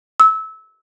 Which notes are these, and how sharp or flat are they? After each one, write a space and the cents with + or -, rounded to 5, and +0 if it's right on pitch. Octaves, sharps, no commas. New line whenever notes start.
E6 -25